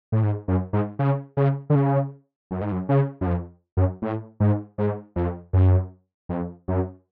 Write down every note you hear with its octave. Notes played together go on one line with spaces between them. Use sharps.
A2
G#2
F#2
G#2
C#3
C#3
D3
C#3
F#2
G#2
F#2
C#3
F#2
F2
F#2
A2
G#2
G#2
F2
F#2
F2
F#2